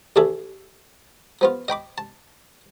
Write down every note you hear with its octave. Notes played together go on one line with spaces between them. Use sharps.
A1 D2 D4 G#4 A4 E5
F3 B3 F4
D#5 G5 B5 D6
A5